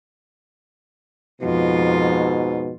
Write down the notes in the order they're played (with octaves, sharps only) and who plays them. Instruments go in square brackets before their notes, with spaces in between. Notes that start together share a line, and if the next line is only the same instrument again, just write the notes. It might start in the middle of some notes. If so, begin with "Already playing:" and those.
[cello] F2 F4 [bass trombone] G#2 [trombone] B2